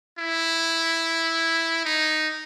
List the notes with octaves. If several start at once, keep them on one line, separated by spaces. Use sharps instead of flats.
E4
D#4